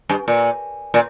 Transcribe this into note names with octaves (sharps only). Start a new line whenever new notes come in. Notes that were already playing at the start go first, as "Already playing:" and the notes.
G2
A#2
A#2